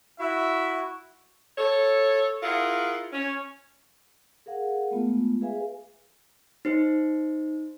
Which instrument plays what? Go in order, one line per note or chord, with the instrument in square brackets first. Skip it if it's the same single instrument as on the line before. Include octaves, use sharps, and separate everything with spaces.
[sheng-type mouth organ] E4 F#4 [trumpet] E5
[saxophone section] A4 C#5
E4 F4 G#4 A#4 F#5
C#4
[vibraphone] G#4 A#4 F5 F#5
G#3 A3 B3 F4
G#4 B4 E5 F5 G#5
[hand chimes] D#4 C5